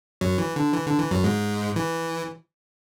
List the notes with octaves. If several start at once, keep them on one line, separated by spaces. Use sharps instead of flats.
F#2 F#3
E3
D3
E3
D3
E3
F#2 F#3
G#2 G#3
E3